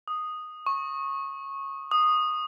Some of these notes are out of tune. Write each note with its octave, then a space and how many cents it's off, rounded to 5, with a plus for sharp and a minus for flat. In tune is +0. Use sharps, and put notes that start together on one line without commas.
D#6 -5
C#6 -15
D#6 -10